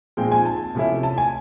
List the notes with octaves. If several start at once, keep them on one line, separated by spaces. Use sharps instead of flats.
A#2 F3 G#3 C4 D#4 G5
G#5
A5
C3 F3 A3 C#4 E4
A5
G#5